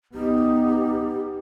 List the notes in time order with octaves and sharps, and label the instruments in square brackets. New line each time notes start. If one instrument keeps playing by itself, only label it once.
[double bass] B3 D#4 [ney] G4